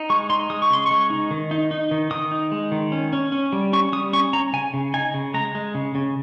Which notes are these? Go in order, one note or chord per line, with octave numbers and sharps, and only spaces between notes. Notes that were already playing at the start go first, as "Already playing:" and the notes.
Already playing: D#4
G#3 C#6
D#4 C6
G#3 D#6
C#6
C#3 C6
G#3 C#6
D#4
D#3
D#4
D#4
D#3
D#3 D#6
D#4
G#3
D#3
C#4
C#4
C#4
G3
C#4 C#6
G3 D#6
C#4 C#6
C#4 A#5
C#3 G#5
C#3
D#4 G#5
C#3
G#3 A#5
G#3
C#3
C#3